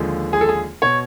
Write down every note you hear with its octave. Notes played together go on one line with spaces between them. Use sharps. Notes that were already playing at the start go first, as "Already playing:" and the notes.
Already playing: D#2 D3 F3 G#3
G#4
A4
G#4
B2 C#5